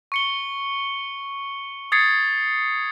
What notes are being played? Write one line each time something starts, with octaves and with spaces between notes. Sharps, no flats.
C#6 C#7 G7
D#6 G#6 A6 C7 C#7